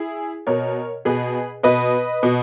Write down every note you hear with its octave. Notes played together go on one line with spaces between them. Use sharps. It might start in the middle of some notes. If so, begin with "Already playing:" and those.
Already playing: E4 G#4
B2 A#4 C#5
B2 G#4 B4
B2 B4 D#5
B2